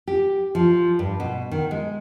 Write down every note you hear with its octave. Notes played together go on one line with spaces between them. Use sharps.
G4
F3
G2
B2
D#3
G#3